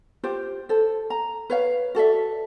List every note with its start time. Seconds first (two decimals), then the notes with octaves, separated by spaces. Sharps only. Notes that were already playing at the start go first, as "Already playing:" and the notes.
0.24 F4 G4 C5
0.69 A4 C5
1.10 A#5
1.50 B4 C#5 F5
1.95 F#4 A4 D5 E5